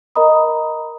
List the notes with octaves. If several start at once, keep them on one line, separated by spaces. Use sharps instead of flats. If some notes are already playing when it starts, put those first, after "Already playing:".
A#4 D#5 A#5 B5 D#6